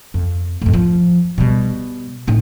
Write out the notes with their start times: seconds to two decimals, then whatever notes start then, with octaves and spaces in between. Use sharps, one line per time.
0.14 F2
0.62 F2 A2
0.73 F3
1.38 B2 G3
2.27 A2 D#4